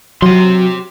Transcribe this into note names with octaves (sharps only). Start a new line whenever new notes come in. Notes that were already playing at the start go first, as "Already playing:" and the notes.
F#3 G4 C6